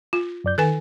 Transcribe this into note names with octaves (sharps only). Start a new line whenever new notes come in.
F4
F#2 D5 G6
D#3 A4 B4 G#5